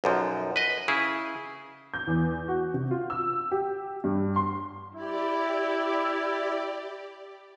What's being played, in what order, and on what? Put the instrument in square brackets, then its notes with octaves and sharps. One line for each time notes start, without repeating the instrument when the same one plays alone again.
[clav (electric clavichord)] B1 F#2 F3
B4 D#5
C#3 E4 G#4
[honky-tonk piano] G6
E2
F#4
C3
F4
E6
G4
G2
C6
[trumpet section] E4 [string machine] G4 D5